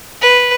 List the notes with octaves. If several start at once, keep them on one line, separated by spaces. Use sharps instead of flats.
B4